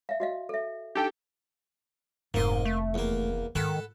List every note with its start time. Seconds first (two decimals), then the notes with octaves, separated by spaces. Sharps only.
0.09 E5 F5
0.20 F#4 D#5 F5
0.49 A4 E5
0.95 D4 D#4 G4 A4 G5
2.34 F1 G#2 D#3 A#3 D#5 C6
2.65 A3
2.94 E2 A#3
3.55 G#2 D#3 A4 F#5 B5